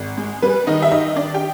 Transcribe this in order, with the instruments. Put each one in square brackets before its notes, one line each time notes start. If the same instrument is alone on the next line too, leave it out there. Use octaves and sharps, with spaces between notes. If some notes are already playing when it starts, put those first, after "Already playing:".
Already playing: [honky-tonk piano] G#1
G#3
G3 B4
D#3 D#4 D#5
E5
D#3 D#4 D#5
D#3 D4 D5
G4 G5